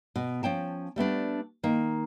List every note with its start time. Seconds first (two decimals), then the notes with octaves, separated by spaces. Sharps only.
0.16 B2
0.43 F3 C#4 G5 A5
0.96 G3 A3 B3 D4
1.63 D#3 A#3